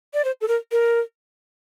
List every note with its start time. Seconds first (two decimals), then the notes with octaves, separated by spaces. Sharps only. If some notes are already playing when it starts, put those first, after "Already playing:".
0.14 D5
0.24 C5
0.41 A4
0.48 A#4
0.72 A#4